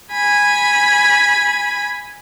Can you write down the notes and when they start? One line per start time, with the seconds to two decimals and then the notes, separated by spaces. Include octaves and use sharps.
0.12 G#5 B5